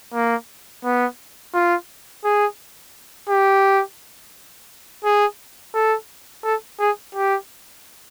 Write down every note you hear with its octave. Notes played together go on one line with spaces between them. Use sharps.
A#3
B3
F4
G#4
G4
G#4
A4
A4
G#4
G4